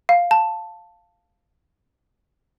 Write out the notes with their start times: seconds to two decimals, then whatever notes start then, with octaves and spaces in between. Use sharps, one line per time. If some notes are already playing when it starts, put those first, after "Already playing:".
0.09 F5
0.31 A5